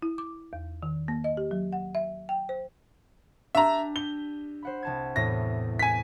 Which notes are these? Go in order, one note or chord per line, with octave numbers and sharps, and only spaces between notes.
E4
D6
E2
D#3
A#3
D#5
G4
F#3
F#5
E5
G5
C5
D4 G4 E5 A#5
G6 G7
C5 F#5 B5
C2 A5 G#6
E2 A2 A#6
G#5 B6